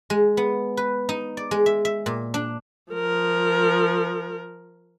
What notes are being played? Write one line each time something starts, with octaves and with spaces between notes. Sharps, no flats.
G#3
B3
B4
D#4
D5
G#3
E5
E5
A#2
D4
F3 A#4